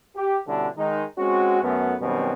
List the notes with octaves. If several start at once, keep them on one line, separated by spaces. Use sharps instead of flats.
G4
B2 D3 G3 C#4 D4 E4
D#3 G#3 D#4
G#3 C4 C#4 F#4
F#2 A3 B3
F#2 B2 D#3 G3 B3 C4